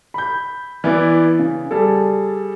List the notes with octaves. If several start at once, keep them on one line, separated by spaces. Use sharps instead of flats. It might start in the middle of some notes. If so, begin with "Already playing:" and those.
B5 G6
E3 B3 E4 D5
C#3
G3 G#4 A4